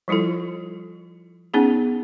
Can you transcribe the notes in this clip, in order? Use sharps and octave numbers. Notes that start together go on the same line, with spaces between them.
F3 G3 E4 F4 A4
B3 C#4 D#4 G#4